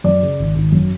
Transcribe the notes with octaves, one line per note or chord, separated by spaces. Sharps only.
F#2 D5
C#3
G#1
G#1
F#2